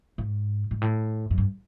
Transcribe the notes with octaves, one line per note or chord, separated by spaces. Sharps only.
G#2
G#2
A2
F#2
G2